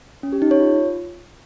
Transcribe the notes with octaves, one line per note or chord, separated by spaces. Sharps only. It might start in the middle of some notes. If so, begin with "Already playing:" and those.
C#4
G4
D#4
C#5
F4